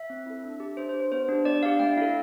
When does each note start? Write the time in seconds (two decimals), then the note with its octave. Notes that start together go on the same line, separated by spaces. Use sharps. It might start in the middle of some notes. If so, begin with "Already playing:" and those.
Already playing: E5
0.10 C4
0.26 E4 A4
0.44 D4
0.60 G4
0.77 D4 C5
0.89 C5
0.94 G4
1.00 C5
1.12 B3 C5
1.29 D4 G4
1.45 B3 D5
1.63 D4 G4 F5
1.80 A3 G5
1.97 E4 A4 F5